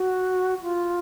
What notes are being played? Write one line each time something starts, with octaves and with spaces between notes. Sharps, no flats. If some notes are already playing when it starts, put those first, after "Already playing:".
Already playing: F#4
F4